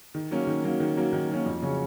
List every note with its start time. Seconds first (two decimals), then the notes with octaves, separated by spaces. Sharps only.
0.15 D#3
0.31 F#3 A#3 C#4
0.47 D#3
0.64 F#3 A#3 C#4
0.80 D#3
0.96 F#3 A#3 C#4
1.13 D#3
1.29 F#3 A#3 C#4
1.46 F2
1.62 C#3 F#3 C#4